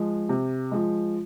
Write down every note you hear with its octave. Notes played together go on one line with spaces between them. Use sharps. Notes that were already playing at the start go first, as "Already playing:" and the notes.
Already playing: F3 G#3
C3
F3 G#3